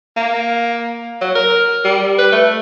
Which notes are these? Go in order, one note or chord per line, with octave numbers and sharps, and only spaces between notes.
A#3
F#3
A#4
G3
B4
A3